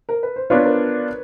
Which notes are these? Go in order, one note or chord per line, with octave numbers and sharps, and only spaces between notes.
A#4
B4
C5
B3 D4 F4 B4 C#5
A#4 C5